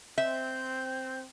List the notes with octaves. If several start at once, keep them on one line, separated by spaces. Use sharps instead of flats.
C4 E5 G6